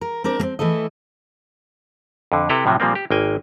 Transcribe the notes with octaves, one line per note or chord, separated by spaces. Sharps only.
A#4
C4 D4 A#4 D5
A#3 C4
E3 A3 E4 A4 D#5
F2 D3
C3 E4 A4 B4 G5 A#5
A2 C3 F3 F#3
A#2 F3 G3 A#3 C4
G4
G#1 A#3 G5 G#5